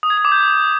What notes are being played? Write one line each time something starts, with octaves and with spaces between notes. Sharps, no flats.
D#6
G#6
D#6
D6
G6